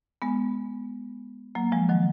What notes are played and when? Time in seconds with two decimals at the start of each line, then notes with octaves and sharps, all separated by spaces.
0.22 G#3 B3
1.55 F#3 A#3
1.72 F3 G#3
1.89 D#3 F#3